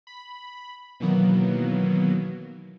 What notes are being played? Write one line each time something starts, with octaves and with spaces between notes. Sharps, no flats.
B5
B2 D#3 E3 F#3 A#3 B3